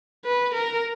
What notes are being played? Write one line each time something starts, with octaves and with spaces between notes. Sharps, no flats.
B4
A#4